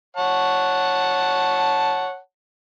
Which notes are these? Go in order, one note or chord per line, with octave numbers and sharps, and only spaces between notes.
C#5 F#5 A5